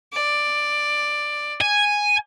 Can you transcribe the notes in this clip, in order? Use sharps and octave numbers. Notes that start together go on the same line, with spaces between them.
D5
G#5